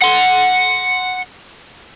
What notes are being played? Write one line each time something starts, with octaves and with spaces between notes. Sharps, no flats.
F#5 C6